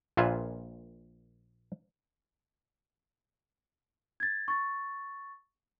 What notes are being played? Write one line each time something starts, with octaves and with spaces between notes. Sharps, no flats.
A#1 A#2 F4 B4 E5 G#5
G#6 A6
C#6 A6